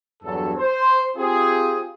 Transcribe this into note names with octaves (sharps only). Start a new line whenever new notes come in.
E2 G2 F#3 A4
C5
C4 F4 G4 G#4